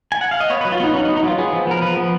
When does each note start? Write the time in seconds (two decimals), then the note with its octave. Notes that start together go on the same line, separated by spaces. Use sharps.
0.12 G#5
0.21 F#5
0.31 F5
0.40 D#5
0.50 B3 C#5
0.61 F#3 B4
0.72 F4
0.80 B3 D#4
0.94 F#3 C#4
1.05 D#4
1.09 B3
1.17 D#4
1.23 F#3 F4
1.38 B3 G#4
1.53 F3
1.67 B3 A#4
1.82 F3 B4
1.97 B3